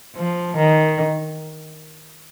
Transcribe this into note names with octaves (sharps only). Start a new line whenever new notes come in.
F3
D#3